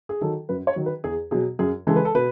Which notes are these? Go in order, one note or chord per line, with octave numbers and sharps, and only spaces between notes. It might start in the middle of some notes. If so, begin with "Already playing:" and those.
G#4
D#3 F#3 A4
F#2 B4
C#5
D#3 F#3
B4
E2 G#4
B2 F#3 G#4
F#2 G#4
C#3 E3 G#3 A4
B4
A4
B2 B4